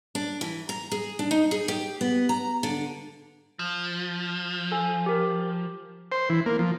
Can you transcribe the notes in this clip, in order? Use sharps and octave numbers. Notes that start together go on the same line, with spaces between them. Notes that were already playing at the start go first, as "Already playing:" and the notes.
D4
E3
A#5
G#4
D4
D#4
G#4
G4
B3
A#5
D3
F3
A4 G#5
G4 A#4
C5
E3
A#3
F3